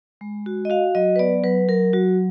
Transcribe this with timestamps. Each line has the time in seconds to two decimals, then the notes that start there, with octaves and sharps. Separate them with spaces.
0.21 G#3
0.46 F#4
0.65 D#5
0.70 F#4 F5
0.95 F#3 D#5
1.16 B4
1.19 B3 D5
1.44 F#3 B4
1.69 F#3 A#4
1.93 F#3 F#4